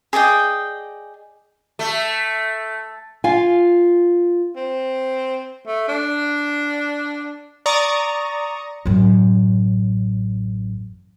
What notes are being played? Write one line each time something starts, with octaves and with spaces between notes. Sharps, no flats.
G#4 D5 D#5 G5
A3
F4 F5 G#5
C4
A3
D4
D5 A#5 C#6 D#6
A1 F#2